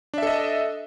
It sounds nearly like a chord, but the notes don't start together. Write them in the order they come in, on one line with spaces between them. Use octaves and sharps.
D4 E5 A4 D#5